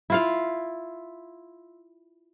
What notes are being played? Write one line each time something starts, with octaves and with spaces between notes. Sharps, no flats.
E4 F4 F5